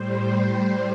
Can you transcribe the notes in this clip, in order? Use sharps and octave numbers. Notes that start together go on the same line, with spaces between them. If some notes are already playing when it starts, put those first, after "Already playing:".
Already playing: A2 G3 C5
C5